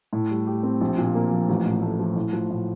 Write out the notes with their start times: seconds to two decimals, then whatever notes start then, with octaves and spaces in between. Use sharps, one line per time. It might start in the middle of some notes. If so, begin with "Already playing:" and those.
0.13 A2
0.31 G3
0.47 G4
0.63 C4
0.81 A#1
0.98 A#2
1.15 A#3
1.32 F3
1.49 A1
1.66 A2
1.82 A3
1.99 F3
2.16 A2
2.33 F3
2.50 A2